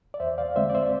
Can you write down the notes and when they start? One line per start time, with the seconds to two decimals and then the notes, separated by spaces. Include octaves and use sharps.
0.14 D5
0.20 E2 C5 E5
0.38 D5 F5
0.56 D3 G#3 C4 C5 E5
0.70 D5
0.75 C5 E5